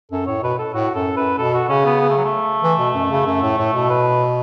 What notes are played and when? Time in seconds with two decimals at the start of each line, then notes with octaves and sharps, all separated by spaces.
0.12 F#2 A4
0.27 A2 C#5
0.43 B2 B4
0.59 A4
0.74 A2 F#4
0.95 F#2 A4
1.17 F#2 B4
1.37 B2 A4
1.54 F#4
1.69 C#3 C#4
1.85 B3
2.00 B3
2.09 A3
2.17 F#3
2.25 A3
2.63 E3
2.79 B2
2.95 F#2
3.11 C#3
3.27 F#2
3.42 A2
3.58 A2
3.74 B2
3.90 B4